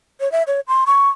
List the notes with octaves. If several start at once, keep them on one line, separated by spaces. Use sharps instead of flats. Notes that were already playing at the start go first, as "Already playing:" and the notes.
C#5
E5
C#5
C6
C#6